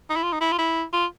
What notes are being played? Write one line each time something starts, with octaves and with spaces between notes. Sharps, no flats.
D#4
E4
F4
D#4
E4
F4
E4
F4